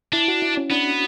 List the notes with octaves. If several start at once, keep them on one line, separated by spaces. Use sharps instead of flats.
D4 E4
F#4
E4
C#4
B3 D4